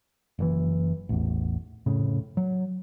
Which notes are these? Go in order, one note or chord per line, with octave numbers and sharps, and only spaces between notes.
F#1 A#2 E3
A1 E2
F1 A2 C#3
F#3